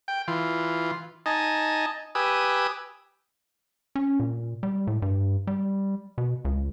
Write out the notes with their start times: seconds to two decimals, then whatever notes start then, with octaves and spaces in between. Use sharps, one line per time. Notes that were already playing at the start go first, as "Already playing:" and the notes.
0.08 G5
0.28 E3 F4
1.26 D#4 D#5 G#5 A5
2.15 G4 B4 G#5 D#6 E6
3.95 C#4
4.20 A#2
4.63 G3
4.87 A2
5.02 G2
5.47 G3
6.18 B2
6.45 C#2